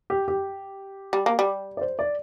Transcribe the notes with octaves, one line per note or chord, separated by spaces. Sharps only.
G4
G4
G3
A#3
G3
D5
C5
D5